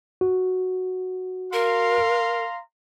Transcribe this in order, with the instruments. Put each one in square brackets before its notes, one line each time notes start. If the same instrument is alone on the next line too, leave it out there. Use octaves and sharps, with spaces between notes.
[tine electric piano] F#4
[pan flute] A#4 [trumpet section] F5 A#5 C6